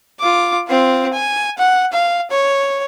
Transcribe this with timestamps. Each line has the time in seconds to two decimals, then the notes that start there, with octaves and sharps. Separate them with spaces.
0.20 F4 D6
0.68 C4 F4
1.13 G#5
1.58 F#5
1.93 F5
2.31 C#5